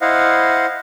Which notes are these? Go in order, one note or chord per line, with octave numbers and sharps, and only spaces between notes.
E4 C5 D#5 F5 F#5